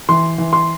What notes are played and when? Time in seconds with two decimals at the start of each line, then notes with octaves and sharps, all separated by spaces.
0.09 E3 C6
0.38 E3
0.53 C6